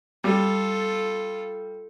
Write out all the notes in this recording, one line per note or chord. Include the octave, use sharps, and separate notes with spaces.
G3 F4 A4